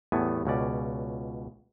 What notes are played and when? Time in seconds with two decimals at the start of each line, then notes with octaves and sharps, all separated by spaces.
0.12 E2 A2 G3 A3 B3 G#5
0.45 C#2 B2 C#4 D5